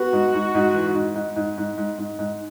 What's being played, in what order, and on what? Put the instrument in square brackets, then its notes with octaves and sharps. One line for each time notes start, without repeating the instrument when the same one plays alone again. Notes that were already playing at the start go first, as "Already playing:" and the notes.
Already playing: [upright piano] B3 [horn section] F#4
[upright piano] G#2
G#2
G#2
E3
G#2
G#2
G#2
G#2
G#2
G#2
G#2